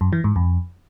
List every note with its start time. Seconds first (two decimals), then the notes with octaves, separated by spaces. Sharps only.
0.01 F#2
0.13 E3
0.24 G#2
0.36 F2